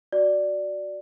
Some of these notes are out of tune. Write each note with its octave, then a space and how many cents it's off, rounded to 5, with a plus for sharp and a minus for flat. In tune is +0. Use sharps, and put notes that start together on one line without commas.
F#4 +0 D5 +0